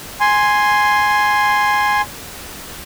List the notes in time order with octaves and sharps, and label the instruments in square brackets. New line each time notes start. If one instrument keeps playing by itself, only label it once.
[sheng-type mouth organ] G#5 C6